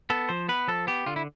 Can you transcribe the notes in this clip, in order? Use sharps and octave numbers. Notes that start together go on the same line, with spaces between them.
B3 A4
F3 C5
B3 B4
F3 A4
B3 G4
D3 F4
E4